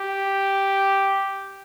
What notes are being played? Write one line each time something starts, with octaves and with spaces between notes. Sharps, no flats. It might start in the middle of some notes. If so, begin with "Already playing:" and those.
Already playing: G4